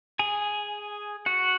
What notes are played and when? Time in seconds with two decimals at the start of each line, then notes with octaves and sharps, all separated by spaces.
0.19 G#4 G#5
1.26 F#4 F#5